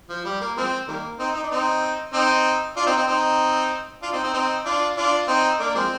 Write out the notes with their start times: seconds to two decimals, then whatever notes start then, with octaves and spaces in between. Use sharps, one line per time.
0.09 F3
0.25 G3
0.41 A#3
0.57 F3 G#3 C4
0.88 D#3 G3 A#3
1.19 C4 D#4
1.34 D#4
1.43 D4
1.51 C4 D#4
2.13 C4 D#4
2.76 D4 F4
2.86 C4 D#4
2.97 C4
3.08 C4 D#4
4.02 D4 F4
4.12 C4 D#4
4.23 C4 D#4
4.34 C4 D#4
4.65 D4 F4
4.97 D4 F4
5.28 C4 D#4
5.59 A#3 D4
5.75 F3 G#3 C4